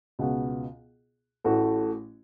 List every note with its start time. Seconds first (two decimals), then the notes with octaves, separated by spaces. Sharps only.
0.19 C#2 B2 B3 F#4
1.44 A1 A2 A3 F#4